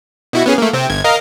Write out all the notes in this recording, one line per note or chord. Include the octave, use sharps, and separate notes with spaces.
B2 E4 F#4
B3 C#4 G#4
A3 A#3
C3 C4
G1 G#6
A#4 D#5 F5